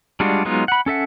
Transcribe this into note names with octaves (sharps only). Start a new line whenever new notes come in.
G3 G#3 D4 F4 F#4
F#3 G#3 B3 D#4 F4
F#5 B5
C#4 A4 E5 F#5